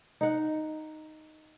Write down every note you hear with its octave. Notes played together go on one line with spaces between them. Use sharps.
D#4 F#5